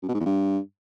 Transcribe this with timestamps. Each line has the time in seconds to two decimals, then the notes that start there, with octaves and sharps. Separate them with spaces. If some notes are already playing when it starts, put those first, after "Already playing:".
0.03 F#2
0.08 B2
0.14 G#2
0.20 E2
0.26 G2